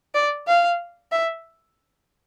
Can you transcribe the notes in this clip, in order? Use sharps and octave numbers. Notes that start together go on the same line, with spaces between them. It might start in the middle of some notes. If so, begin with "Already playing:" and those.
D5
F5
E5